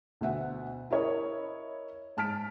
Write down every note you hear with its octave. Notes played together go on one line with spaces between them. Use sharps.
D2 B2 E5 F#5
E4 A#4 C#5 D#5
G#2 A5 F6 B6 D7